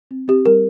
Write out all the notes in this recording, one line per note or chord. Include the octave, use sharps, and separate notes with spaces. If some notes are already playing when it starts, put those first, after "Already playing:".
C4
C4 G4
G3 A#4